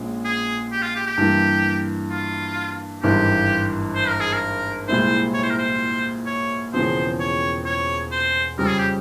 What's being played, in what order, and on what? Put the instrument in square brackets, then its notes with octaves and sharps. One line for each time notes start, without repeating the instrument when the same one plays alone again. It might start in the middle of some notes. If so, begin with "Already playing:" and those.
Already playing: [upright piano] A#1 A#2 G#3 C#4
[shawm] G#4
G4
F4
G4
G4
[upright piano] G2 E3 A#3
[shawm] F4
[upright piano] G#1 G2 E3 [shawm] G4
[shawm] C5
A#4
G#4
A#4
[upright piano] C2 A#2 G#3 C4 E4 [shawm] C5
[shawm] C#5
C5
A#4
C5
C#5
[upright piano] E1 E2 C#3 F3 C4 [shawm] C5
[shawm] C#5
C#5
C5
[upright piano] F2 C#3 G3 [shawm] A#4
[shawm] G#4
G4